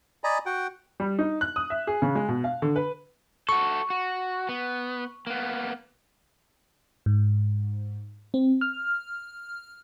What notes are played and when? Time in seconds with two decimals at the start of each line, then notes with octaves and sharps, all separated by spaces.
0.24 D5 D#5 G#5 A#5 B5
0.46 F#4 F#5 G5
1.00 G3
1.19 D#4
1.41 F#6
1.56 D#6
1.70 E5
1.87 G#4
2.02 C#3
2.15 G#3
2.28 B2
2.44 F5
2.62 D3
2.76 B4
3.49 F#4 A4 C#6
3.90 F#4
4.49 B3
5.27 A#3 B3
7.06 G#2
8.34 C4
8.61 F6